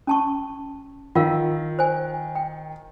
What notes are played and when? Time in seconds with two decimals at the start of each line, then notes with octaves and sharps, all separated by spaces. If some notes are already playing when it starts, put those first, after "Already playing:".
0.07 C#4 A5 C#6
1.15 D#3 F4 A#4 F5
1.79 C5 G#5
2.35 G5